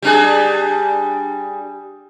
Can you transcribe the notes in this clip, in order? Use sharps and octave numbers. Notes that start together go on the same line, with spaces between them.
G3 D4 G#4